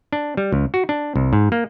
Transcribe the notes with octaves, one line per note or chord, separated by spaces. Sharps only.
D4
G3
C#2
F#4
D4
C2
G#2
A#3